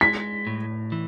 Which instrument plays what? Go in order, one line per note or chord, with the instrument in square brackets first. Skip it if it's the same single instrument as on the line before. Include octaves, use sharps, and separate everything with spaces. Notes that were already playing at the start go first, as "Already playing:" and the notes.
[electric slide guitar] G#3 [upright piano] B6
[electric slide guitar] A2
E3